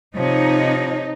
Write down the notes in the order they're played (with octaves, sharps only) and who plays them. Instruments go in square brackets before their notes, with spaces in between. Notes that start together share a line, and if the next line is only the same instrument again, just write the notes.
[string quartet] C3 C#5 [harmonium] F3 [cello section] D#4